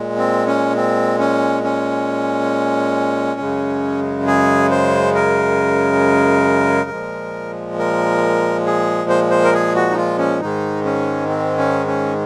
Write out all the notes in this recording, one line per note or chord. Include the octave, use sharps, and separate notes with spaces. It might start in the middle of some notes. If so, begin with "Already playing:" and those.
Already playing: A#2 G#3
C4
C#4
C4
C#4
C#4
F#2 C#3 G#3
G#4
C5
A#4
A#2 F3 G#3
A#4
G#4
C5
C5
A#4
G#4
F#4
D#4
F4
C#4
G#2 D#3 G#3 D#4
C#4
C4
C#4
C#4